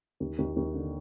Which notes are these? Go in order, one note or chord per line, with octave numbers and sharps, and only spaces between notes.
D#2
D#2
D#2
D3